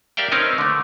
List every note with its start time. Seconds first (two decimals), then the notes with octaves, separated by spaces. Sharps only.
0.17 G4 A#4 D5 E5 F5 G5
0.32 C4 C#4 D#4 A#4 B4
0.58 D3 A3